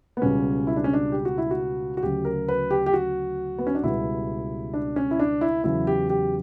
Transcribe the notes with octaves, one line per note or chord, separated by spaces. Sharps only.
B3
C#2 B2 G3 C#4
E4
D4
C#4
D4
G4
F#4
E4
F#4
F#4
D2 C#3 F#3 G4
A#4
B4
G4
G4
F#4
B3
C#4
D4
C#2 B2 G3 E4
D4
C#4
E4
D4
E4
E2 C#3 F#3 E4
G4
G4